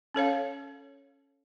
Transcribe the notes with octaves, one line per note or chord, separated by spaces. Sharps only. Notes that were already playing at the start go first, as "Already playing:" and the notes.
C#4 A4 C#5 F5